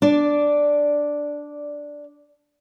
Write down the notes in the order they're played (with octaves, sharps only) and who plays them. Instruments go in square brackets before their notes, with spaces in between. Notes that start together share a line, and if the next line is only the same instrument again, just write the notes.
[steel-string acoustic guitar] D4 D5